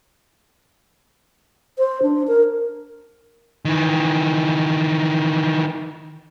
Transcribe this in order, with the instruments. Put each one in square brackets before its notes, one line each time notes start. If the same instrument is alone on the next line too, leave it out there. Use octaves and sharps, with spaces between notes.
[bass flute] C5
D4
A#4
[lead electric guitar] D#3 E3